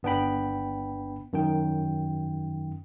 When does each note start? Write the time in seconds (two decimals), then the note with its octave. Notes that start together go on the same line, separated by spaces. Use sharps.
0.03 G1 B3 D4 G5 B5
1.33 F#2 D#3 G5